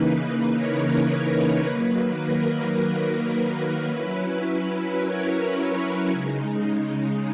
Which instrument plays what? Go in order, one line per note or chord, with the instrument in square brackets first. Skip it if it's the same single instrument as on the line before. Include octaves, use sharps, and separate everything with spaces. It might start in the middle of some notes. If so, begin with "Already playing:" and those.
Already playing: [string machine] C#3 E3 A#3 D#4 B4
A#4 C#5
D#3 F#3 A#3 B4
A#4
F#3 C#4 E4 B4
A#4 C#5
A#4 C#5
C#3 G#3 D#4